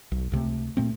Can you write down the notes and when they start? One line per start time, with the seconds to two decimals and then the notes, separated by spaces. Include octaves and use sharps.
0.12 B1
0.32 C#2 C3 A3
0.77 A#2 A3 C4